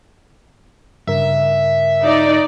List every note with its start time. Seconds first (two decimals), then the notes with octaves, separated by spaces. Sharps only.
1.07 G2 C#3 A#4 E5
2.03 D#4 D5